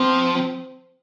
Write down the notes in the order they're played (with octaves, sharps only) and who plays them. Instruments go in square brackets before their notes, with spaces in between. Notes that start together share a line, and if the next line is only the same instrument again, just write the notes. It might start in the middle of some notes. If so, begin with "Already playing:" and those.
Already playing: [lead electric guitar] F3 [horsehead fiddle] C4